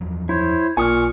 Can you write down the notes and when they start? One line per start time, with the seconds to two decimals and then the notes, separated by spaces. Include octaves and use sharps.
0.01 E2 F3 F#3
0.29 E4 C5 C#5
0.77 B1 A#2 G#5 C#6 D#6 F6